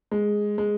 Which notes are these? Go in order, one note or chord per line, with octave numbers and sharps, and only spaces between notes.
G#3
G#3